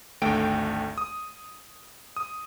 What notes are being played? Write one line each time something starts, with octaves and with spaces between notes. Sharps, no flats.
G#1 D2 A3 G5 D7
D#6
D#6